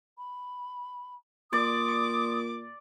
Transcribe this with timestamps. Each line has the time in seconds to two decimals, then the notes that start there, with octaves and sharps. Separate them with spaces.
0.16 B5
1.53 A#2 D5 C6 D6 D#6